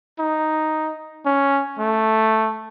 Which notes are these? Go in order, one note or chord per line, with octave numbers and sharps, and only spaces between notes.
D#4
C#4
A3